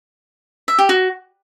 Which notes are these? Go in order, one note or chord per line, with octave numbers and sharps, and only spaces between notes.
E5
G4
F#4